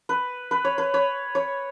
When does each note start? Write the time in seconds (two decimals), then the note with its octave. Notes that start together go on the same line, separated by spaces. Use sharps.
0.09 B4
0.51 B4
0.65 C#5
0.78 B4
0.94 C#5
1.35 C#5